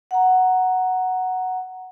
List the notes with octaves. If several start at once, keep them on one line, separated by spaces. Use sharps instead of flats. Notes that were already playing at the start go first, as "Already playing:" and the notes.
F#5 A#5